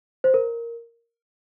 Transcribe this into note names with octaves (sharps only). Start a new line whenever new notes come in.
C5
A#4